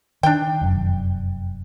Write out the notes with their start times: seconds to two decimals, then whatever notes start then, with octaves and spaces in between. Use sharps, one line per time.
0.23 D#3 D4 G5
0.61 F1 F#2